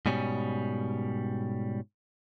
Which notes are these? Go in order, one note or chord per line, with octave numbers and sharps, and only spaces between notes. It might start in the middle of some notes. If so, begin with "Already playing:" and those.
G#2 B2 G3 C#4